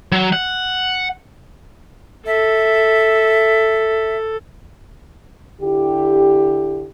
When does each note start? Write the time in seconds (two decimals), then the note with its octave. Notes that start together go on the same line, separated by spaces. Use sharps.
0.12 F#3
0.33 F#5
2.27 A4 E5
5.62 D3 E4 G4